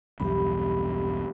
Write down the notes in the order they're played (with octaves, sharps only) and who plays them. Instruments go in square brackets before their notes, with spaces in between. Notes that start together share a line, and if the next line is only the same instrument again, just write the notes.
[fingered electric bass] B1 E2 G2 [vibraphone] G4 B5